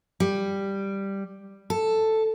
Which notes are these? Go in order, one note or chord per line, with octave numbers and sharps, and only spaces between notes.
G3
A4